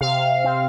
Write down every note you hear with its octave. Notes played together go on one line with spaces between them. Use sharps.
C3 F5
C4